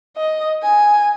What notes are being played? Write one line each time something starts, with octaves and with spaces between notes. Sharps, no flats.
D#5
G#5